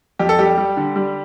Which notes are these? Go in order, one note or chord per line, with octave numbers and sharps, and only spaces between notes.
F2 G4
A4
G3 G4
G3
D3
G3